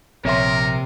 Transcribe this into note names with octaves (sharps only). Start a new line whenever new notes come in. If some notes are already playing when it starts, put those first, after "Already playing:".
A#1 C3 A#4 C#5 E5 C6